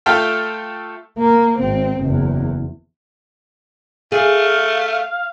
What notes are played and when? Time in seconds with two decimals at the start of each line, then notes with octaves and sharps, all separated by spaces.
0.06 A3 F4 A4 E5 F5 G5
1.19 A#3
1.59 G#1 C4
2.01 F#1 E2
4.12 A3 G#4 F5